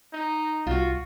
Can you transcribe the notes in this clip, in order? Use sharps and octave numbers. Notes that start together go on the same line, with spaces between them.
D#4
C2 F4 F#4